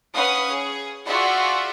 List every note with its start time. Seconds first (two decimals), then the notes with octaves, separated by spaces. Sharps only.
0.14 C#4 B4 F5 F#5 D#6
0.50 G#4
1.06 F4 F#4 G#4 D5 E5 F#5